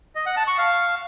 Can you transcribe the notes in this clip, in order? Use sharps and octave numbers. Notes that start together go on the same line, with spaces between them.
D#5
F#5
A5
C#6
F5